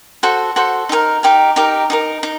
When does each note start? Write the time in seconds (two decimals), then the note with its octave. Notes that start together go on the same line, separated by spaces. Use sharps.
0.23 F#4 A4 C5
0.56 F#4 A4 C5
0.89 D#4 G4 A#4
1.23 D#4 G4 A#4
1.56 D#4 G4 A#4
1.90 D#4 G4 A#4
2.23 D#4